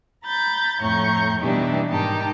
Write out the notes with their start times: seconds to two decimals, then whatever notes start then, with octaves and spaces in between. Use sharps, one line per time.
0.25 A#5 B5 G6 A6
0.81 F2 A2 C#5 A#5 C#6 G6
1.41 B2 E3 G3 D4 D#4 G4
1.90 G#2 D#3 D#4 G4 A5